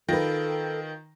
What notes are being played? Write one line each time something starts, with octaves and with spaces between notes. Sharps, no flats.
D#3 F4 A4 B4 G5 A#6